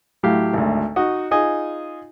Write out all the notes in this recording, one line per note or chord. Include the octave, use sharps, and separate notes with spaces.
A2 F#3 E4 G4 F5
G#1 D2
D#4 F#4 D#5
D#4 F4 G#4 D#5 G#5